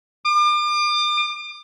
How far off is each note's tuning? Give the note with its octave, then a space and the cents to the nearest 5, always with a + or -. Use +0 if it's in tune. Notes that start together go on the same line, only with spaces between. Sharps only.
D6 +40